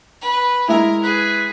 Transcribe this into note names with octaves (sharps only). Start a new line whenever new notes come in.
B4
G#3 E4 A#4 E5
G#4 B4